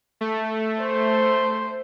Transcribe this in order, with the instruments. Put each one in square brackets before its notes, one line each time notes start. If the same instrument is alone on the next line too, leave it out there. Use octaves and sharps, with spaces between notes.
[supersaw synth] A3
[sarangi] C5